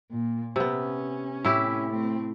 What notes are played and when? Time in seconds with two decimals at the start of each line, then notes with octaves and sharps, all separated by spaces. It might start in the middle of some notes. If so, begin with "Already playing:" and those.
0.11 A#2
0.56 C3 B3 C#4
1.45 A2 E4 G4
1.90 A3 C4